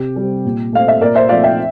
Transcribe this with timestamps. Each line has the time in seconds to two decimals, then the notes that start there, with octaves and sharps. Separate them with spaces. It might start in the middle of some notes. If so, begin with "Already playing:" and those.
Already playing: C3 G4
0.16 G3 C4
0.45 A#2
0.73 A3 C4 F5
0.88 E5
1.01 A#2 A#4 D5
1.15 C5 E5
1.29 F3 A3 C4 D5 F5
1.43 E5 G5